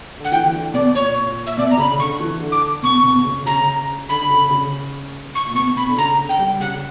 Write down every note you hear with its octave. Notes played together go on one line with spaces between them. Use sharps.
D3 F#5
E3 G5
E3
D3
B2 D5
A#2 C#5
A#2
E5
B2 D5
A#5
C#3 B5
D3 C#6
E3
D3
D6
B2 C#6
B2
C#3
C#3 A#5
D3 B5
D3
C#3
C#3
C#6
A#2
B2 C#6
B2 B5
D3
C#3 A#5
D3
G5
G3
C#3 F#5